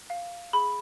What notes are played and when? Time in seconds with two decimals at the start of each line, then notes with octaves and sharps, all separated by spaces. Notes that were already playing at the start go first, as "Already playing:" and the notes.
0.10 F5
0.53 G#4 B5